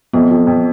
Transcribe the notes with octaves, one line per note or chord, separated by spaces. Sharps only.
F2 B3
F2
F2